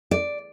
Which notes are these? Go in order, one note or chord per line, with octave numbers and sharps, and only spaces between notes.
D5